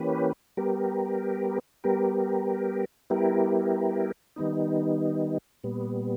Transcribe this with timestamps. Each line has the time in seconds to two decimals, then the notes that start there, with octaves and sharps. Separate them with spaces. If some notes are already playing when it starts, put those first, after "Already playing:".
Already playing: E3 A#3 C#4 G4 B4
0.57 G3 B3 G4 A#4
1.84 G3 B3 G4 A#4
3.10 G3 B3 E4 G4 A#4
4.36 D#3 G3 B3 D#4
5.63 A#2 G3 B3